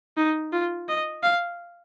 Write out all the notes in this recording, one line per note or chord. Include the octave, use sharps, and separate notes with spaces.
D#4
F4
D#5
F5